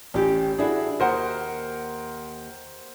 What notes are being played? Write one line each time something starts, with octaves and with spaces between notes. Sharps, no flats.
A1 C#4 G4
D4 E4 F#4 G#4
D#2 A#4 C5 F#5